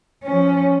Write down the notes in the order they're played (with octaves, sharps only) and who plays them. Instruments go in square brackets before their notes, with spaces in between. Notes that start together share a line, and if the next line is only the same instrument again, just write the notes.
[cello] F3 C#4